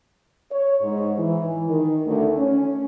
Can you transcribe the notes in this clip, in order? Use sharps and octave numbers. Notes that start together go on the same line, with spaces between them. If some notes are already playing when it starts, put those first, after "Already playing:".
C#5
G#2
E3
D#3
D2
C#4